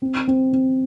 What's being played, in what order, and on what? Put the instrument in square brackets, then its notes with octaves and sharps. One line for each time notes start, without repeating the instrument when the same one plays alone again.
[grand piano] C4
C4
C4